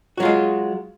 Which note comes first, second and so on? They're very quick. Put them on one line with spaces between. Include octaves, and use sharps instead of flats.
F#4 F#3 F4 G#3